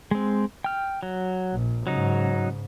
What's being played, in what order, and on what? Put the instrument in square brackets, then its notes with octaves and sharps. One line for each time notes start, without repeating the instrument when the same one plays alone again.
[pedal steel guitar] G#3 C4
G5 F6
F#3
[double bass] A#1
[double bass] G#2 C#3 [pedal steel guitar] F#3 D#4